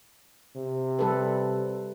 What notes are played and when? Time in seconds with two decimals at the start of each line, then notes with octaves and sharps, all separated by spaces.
0.57 C3
0.99 G3 A4 B4